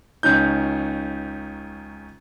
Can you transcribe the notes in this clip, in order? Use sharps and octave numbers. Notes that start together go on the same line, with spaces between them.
C#2 C#4 D#4 G6